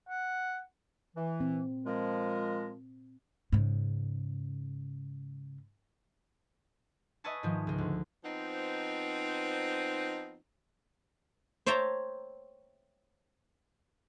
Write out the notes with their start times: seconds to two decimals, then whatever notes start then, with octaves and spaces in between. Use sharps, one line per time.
0.09 F#5
1.16 E3
1.40 A#2 C4
1.86 F3 G#3 A#4
3.52 G#2 C#3
7.24 B4 D#5 E5 G#5 A5 C#6
7.43 G#2 D#3 F3 G#3
7.67 C#2 G#3
7.78 D2
8.25 F3 B3 C4 D#4
11.66 C5 C#5 E5 G5 A5 A#5